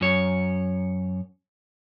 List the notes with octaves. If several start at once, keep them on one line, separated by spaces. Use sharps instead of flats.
F#2 C#5